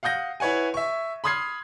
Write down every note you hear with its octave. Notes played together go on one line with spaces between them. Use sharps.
F5 F#5 D#6 G6 A#6
E4 B4 C#5 F#5 G#5
E5 C#6
B5 C6 D#6 F6 G#6 C7